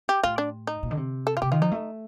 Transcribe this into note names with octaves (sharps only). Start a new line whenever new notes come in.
G4
A2 F4
D4
D#4
A#2
D3
C3
A4
F4
C3 G4
D#3 F4
F3 D#4
A3